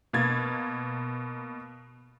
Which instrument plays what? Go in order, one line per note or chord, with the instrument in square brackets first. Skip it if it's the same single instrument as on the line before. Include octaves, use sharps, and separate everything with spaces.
[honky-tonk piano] B2 A#3 G#6 A6